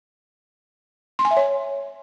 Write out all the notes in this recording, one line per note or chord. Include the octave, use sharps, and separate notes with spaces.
C6
G#5
E5
C#5